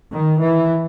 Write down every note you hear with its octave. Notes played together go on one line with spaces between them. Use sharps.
D#3
E3